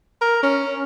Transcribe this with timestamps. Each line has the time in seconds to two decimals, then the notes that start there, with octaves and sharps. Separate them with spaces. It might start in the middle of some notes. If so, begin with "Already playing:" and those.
0.21 A#4
0.43 C#4